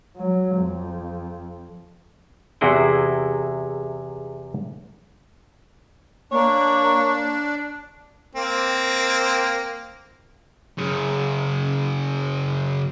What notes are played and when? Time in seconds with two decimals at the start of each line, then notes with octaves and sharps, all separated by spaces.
0.16 F#3
0.56 F2
2.61 E2 C3 E4 F#4 G#4 G5
6.32 A#3 D4 C#5
8.35 A#3 C4
10.78 F#2 C#3